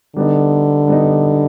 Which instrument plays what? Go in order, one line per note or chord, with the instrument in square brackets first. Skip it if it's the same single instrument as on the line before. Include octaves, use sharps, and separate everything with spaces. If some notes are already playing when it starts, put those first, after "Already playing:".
[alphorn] D3 [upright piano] G3 B3 D#4
[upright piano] G3 B3 D#4